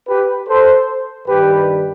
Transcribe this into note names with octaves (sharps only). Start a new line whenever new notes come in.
G4 B4
A4 C5
G2 D#3 G3 G4 B4